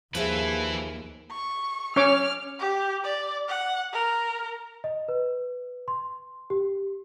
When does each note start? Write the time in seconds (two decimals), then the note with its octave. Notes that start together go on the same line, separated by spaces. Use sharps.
0.15 D#2 F3 E4 G#4 B4 E5
1.31 C#6
1.96 C#4 C#5 D6 F6
2.59 G4
3.04 D5
3.48 F#5
3.93 A#4
4.84 D#5
5.08 B4
5.88 C6
6.50 G4